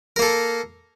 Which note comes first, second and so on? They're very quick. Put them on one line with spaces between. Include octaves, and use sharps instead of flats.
A#4 A#3 A4